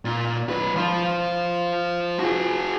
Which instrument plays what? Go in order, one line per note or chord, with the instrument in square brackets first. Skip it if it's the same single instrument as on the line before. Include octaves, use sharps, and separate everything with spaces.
[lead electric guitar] A#2
F#2 B4
F3 F4
F#4 G#4